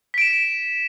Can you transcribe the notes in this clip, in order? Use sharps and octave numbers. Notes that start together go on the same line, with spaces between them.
B6 D7 E7